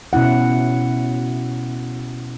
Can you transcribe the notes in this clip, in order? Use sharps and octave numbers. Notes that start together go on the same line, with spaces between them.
B2 C#4 E4 F#5